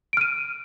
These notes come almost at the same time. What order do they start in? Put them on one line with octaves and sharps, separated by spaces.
D7 F6 D#7